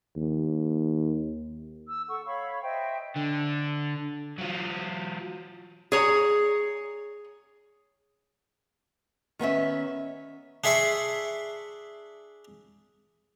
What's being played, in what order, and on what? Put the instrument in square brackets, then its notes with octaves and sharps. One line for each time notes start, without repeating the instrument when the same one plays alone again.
[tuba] D#2
[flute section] E6
A4 F#5 C#6
C#5 F5 B5 C#6
C5 D#5 E5 G5
[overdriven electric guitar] D3
F#3 F4
[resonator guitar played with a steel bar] G#4 C#5 A#5
[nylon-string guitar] D#3 B3 C#4 E5
[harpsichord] D4 G#4 E5 C6 C#6